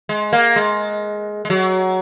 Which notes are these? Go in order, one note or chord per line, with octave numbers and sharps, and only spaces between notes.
G#3
A#3
G#3
G#3
F#3